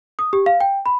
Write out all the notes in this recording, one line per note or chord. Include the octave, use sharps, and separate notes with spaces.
D#6
G4
F5
G5
B5